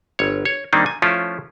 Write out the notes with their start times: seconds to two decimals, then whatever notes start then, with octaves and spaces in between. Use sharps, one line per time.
0.19 G1 C#5
0.45 C#5
0.73 D#3 G3 A#3 C4 D4 D#4
0.86 G#5
1.02 F3 A3 C#4 E4 F4